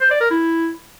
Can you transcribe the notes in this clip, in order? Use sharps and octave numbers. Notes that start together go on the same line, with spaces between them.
C5
D5
A#4
E4